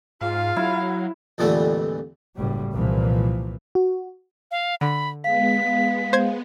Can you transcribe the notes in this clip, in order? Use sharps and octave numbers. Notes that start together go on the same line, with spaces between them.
G#2 F4 F5
F#3 E4
A#1 F2 D3 E3 G3 A3
F#1 A2 G3
C2 A#2 E3 F3
F#4
F5
D3 B5
G#3 B3 F5 B6
C5 G#6